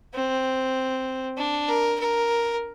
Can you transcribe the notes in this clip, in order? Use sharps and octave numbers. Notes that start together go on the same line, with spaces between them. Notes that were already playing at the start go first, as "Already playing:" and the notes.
C4
D4
A#4
A#4